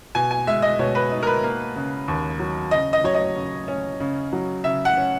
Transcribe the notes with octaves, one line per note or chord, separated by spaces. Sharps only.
B2 G#5
G#5
G#3 E5
D#5
B2 C#5
B4
D#4
A#4
B4
A#3
C#3
D#2
F#3
C#3 D#5
D#5
F#3 C#5
D#5
C#3
C#4
C#3
F#3
C#3 E5
F#5
C#4